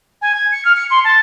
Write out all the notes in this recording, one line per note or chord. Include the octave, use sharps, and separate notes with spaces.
G#5
G#6
C#7
F6
C#7
C6
A5